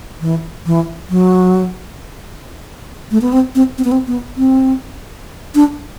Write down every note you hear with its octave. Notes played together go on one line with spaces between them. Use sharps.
E3
E3
F#3
A3
B3
C4
C4
C4
B3
C4
B3
C4
D4